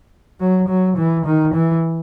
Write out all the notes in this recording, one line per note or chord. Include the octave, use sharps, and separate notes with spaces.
F#3
F#3
E3
D#3
E3